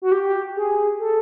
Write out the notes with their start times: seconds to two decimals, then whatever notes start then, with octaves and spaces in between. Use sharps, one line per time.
0.02 F#4
0.12 G4
0.56 G#4
1.00 A4